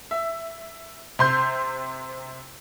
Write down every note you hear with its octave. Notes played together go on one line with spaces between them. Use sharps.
E5
C3 C6 G6